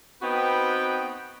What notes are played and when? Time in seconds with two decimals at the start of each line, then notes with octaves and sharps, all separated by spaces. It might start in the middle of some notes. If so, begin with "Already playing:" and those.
0.22 B3 C4 D#4 F#4 B4 G5